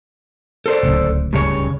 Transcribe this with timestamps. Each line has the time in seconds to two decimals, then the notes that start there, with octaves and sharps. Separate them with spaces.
0.66 A4 C5 D5
0.83 D1 C#2
1.33 G2 C#3 C#5